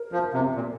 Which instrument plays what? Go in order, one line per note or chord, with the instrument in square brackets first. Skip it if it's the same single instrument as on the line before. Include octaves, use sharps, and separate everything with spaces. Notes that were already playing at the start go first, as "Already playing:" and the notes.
Already playing: [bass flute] A#4
[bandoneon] F3
C3
A#2